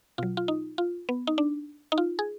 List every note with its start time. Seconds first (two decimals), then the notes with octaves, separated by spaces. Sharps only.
0.18 B2 F#3 F4
0.37 F4
0.48 D#4
0.78 F4
1.09 B3
1.27 D#4
1.38 D4
1.92 D#4
1.98 F4
2.19 G#4